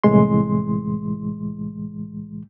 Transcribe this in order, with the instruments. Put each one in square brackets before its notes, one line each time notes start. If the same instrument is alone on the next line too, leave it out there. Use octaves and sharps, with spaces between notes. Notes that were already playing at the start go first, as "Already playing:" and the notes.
[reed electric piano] C2 A2 E3 G#3 C6